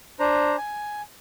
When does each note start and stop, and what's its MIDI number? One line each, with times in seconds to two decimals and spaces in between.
0.19 0.56 62
0.19 0.56 72
0.19 0.56 82
0.58 1.02 80